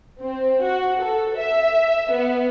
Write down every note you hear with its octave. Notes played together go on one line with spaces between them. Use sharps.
C4
F#4
A4
E5
B3